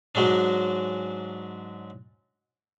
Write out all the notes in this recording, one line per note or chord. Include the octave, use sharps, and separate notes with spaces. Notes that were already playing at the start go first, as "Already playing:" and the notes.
G#2 F#3 G#3 C#4 D4